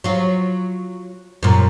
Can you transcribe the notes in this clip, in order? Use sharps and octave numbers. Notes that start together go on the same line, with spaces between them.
F#3 F4
F#2 A#2